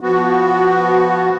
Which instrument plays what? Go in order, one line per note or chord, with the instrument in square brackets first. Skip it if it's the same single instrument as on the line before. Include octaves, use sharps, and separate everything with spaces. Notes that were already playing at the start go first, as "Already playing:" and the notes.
[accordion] F3 B3 F#4